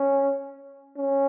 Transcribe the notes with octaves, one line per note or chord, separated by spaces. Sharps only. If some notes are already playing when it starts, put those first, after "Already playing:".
Already playing: C#4
C#4